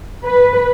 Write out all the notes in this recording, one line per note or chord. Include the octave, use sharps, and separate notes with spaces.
B4